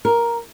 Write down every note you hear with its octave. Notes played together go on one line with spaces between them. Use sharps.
A#4